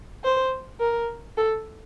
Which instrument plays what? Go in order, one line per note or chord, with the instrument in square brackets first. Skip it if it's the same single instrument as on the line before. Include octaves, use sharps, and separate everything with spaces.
[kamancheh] C5
A#4
A4